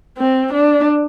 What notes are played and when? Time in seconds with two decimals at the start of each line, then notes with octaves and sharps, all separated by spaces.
0.18 C4
0.53 D4